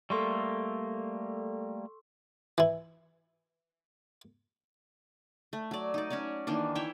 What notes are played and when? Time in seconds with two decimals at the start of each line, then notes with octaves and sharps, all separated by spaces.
0.10 G3 A3 A#3 A4 C6 C#6
2.58 E3 E4
5.53 A3
5.71 F#3 D5
5.94 D#4 D5
6.10 C#4 F#4 C#5 D5
6.47 D#3 E3 A#3 D4
6.75 E4 C#5 E5 G5